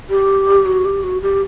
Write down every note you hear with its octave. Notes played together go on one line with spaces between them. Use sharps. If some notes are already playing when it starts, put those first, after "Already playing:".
G4
F#4
G4
F#4
G4